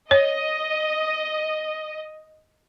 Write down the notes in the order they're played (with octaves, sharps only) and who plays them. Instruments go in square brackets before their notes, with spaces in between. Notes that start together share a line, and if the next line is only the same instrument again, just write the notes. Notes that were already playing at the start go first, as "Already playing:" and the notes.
[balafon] C#5 [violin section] D#5